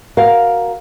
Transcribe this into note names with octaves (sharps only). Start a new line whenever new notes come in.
F#4 A#4 F5